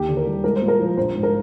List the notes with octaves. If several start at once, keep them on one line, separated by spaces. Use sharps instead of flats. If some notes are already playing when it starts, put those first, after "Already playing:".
Already playing: D#2 G4
D3
A#4
G3
G#3 A#4
C5
A#2
A#4
F3
A#1 C5
G#2
A#4